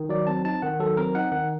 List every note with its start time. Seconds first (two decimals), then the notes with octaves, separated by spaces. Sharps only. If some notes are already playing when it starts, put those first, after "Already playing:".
Already playing: D#3
0.09 F#3 D5
0.27 C4 A5
0.45 D#4 A5
0.62 D#3 F#5
0.80 F#3 A4
0.97 C4 A#4
1.15 D#4 F#5
1.32 D#3 F#5